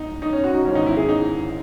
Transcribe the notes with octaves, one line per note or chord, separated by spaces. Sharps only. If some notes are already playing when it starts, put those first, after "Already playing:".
Already playing: D#4
D#4
C#4
F#4
D#4
G#1 G#2 E3 C#4
D#4
E4
G#4
D#4